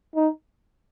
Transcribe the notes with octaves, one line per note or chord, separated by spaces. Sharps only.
D#4